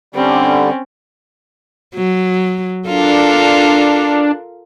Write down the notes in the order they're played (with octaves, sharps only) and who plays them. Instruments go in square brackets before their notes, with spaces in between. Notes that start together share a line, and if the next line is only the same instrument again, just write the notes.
[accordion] D3 G3 [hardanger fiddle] C4 C#4
[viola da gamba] F#3
[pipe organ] D4 [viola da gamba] F4 A4 A#4